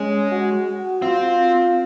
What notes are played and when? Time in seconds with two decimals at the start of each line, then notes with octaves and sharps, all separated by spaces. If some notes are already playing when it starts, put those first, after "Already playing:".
Already playing: G#3 C#4
0.32 F#4
1.02 C4 F4